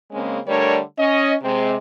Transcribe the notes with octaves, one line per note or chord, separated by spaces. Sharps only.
C#3 G#3 A#3 C4 C#4
D3 G3 A3 D4 A#4 C#5
C#4 D#5
C3 G#3 C4